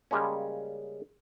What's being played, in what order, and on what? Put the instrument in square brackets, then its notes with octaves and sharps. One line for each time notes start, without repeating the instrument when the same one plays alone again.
[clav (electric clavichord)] C#3 G3 G#3 A#3 C#4